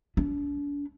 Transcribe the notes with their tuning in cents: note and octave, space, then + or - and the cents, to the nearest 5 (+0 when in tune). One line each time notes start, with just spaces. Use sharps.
D4 -40